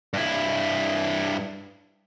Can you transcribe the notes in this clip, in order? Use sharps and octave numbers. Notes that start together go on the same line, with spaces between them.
G2 E4